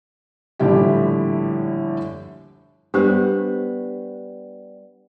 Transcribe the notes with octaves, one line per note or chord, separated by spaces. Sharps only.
A#1 A2 D3 G3 E4 G4
G3 B3 D4 G4 C5